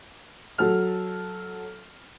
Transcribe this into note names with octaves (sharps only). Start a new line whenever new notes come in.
F#3 A4 F6